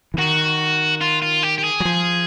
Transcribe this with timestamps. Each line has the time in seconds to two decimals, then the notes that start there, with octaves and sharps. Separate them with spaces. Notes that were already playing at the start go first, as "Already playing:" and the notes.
0.14 E3
0.18 D#3 F#4
1.01 F4
1.22 F4
1.43 G4
1.58 G4
1.64 G#4
1.80 F#3
1.85 F3